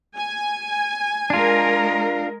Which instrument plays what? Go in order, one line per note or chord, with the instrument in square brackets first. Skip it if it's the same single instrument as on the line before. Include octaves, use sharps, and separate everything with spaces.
[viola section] G#5
[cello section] G#3 A#4 [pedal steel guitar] D4 F4